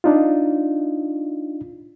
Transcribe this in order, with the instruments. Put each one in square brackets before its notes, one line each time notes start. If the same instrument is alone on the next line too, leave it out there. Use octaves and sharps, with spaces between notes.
[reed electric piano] D4 D#4 F4